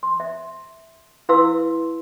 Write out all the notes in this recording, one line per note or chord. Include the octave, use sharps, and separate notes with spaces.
C6
E5
E4 B4 F5 C6 E6